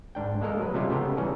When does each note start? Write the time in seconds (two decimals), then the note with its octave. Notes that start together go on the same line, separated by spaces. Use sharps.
0.15 G#2 D4 G5
0.41 G#3 A#3 A4 A#4 D#5
0.59 F#3 B4
0.74 C3 G3 G#3 C#4 E4 F4
0.89 C#3 B3 G4 A4 G5 A#5
1.17 E3 G3 C#4 G#4